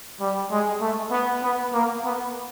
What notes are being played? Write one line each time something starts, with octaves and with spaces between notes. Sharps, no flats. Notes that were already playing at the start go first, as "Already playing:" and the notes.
G3
G#3
A3
B3
B3
A#3
B3